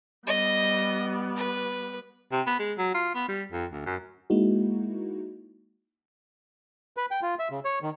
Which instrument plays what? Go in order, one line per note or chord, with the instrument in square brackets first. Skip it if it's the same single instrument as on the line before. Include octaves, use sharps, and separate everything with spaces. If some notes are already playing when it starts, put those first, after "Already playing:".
[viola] G3 B3 [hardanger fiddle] D#5
[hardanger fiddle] B4
[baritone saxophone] C3
B3
G#3
F#3
F4
B3
G3
F2
D2
F#2
[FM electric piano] G#3 A#3 D#4 E4 F#4
[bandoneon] B4
G5
F4
E5
C#3
C#5
D#3